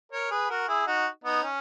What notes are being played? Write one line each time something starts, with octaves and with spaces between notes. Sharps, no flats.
A#4 C#5
G#4 B4
F#4 A#4
E4 G#4
D#4 F#4
B3 D#4
C#4